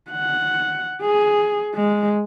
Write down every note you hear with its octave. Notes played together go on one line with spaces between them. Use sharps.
F#5
G#4
G#3